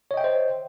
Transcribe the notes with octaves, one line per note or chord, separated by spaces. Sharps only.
C5 C#5 D#5 E5 G5